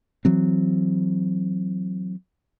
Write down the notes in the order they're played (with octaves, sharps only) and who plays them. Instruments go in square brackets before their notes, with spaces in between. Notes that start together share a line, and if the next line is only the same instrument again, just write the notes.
[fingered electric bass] E3 F#3 C4